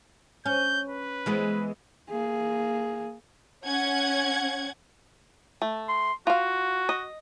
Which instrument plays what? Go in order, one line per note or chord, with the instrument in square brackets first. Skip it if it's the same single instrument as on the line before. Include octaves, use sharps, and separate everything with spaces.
[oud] C#4 [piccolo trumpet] G6
[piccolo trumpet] B4
[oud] E3 G#3 B3
[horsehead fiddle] A#3 G#4
[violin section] C#4 F#5 G#6
[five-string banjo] A3
[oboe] C6
[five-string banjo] F4 F5 [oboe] F#4
[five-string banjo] D#5